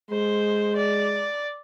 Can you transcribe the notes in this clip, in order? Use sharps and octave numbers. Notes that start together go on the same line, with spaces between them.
G#3 C5
D5